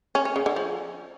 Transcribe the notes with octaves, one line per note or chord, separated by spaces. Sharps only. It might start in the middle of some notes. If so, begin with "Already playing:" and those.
C#4
C#4
C#3
D3
F3